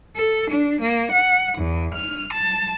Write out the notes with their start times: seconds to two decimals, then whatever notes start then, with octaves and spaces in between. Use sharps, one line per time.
0.15 A4
0.51 D4
0.80 A#3
1.12 F#5
1.57 E2
1.93 F6
2.33 A5